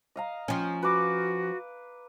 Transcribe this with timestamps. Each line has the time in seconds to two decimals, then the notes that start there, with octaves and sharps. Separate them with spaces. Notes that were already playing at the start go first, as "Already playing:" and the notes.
0.16 D#5 F5 A#5
0.48 F3 C#4
0.82 F#4 B4 D6